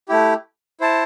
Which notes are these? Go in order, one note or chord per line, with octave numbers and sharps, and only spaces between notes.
A3 E4 G4
E4 C5 A5